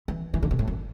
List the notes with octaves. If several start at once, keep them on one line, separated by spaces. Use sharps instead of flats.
E3
E3
D3
B2
A2
F#2